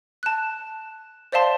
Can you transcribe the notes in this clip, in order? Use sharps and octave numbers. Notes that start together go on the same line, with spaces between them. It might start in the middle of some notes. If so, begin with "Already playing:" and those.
A5 F#6
C5 D5 E5 F5 A5 C6